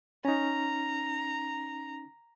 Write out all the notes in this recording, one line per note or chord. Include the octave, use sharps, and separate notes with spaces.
C#4 D#4 A#5